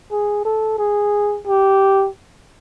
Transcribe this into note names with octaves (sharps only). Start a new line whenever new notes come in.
G#4
A4
G#4
G4